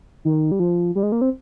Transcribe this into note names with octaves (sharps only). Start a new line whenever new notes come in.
D#3
G3
F3
G3
G#3
A#3
C4